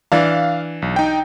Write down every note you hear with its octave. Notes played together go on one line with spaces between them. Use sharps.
E3 D4 F5
B1
D#4 G5